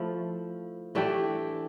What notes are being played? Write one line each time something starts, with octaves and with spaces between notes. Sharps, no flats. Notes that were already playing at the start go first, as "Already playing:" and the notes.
Already playing: F3 A3 E4
E3 A3 D4 G4